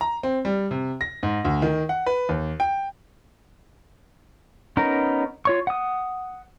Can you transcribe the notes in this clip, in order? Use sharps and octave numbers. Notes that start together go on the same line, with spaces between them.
A#5
C4
G3
C3
A#6
G#2
D2
D#3
F#5
B4
D#2
G5
B3 C#4 D#4 A#4
F4 C#5 C#6
F#5 D#6